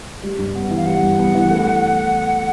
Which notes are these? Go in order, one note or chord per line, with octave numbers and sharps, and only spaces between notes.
G3
G2
B3
E3
F5
G3 F#5
G2
B3
E3
A3